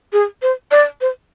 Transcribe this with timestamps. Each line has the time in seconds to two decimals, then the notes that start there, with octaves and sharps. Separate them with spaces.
0.13 G#4
0.42 C5
0.71 D5
1.01 C5